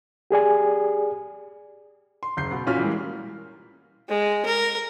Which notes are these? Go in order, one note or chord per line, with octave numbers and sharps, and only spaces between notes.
G4 G#4 D5 G#5
C6
F#1 G6 C7
B2
A1 A#2 C#4 F4 F#4 F6
E3 G3 G#3 A#3
G#3
A#4